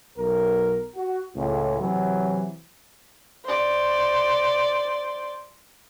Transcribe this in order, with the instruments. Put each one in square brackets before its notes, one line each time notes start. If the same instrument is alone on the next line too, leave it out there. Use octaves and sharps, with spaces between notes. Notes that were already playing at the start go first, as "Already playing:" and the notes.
[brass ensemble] B1 A#4
F#4
C#2 A2
C3 E3 F#3
[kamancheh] C5 D5